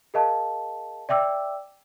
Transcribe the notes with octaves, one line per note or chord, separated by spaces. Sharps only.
G#4 A#4 D#5 F5 A5
D5 E5 G5 D6 E6